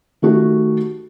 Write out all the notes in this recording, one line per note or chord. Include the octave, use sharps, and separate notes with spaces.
D#3 A3 F#4 G4